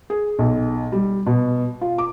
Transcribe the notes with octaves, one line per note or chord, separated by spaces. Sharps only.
G#4
B1
G3
B2
F4
D6